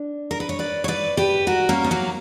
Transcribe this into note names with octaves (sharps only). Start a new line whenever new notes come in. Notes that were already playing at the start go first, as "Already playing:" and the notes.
Already playing: D4
A#4
B4
C#5
B4 D5
C#5
B4 D5
G4 B4
F#4 A#4
A#3 C#4
B3
F#3 A#3